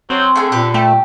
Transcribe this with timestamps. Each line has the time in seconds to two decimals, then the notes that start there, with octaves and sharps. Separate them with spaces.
0.10 F#3 C4
0.35 D3 A3 F4 G#4
0.52 A#2 G4 B4
0.74 A3 G4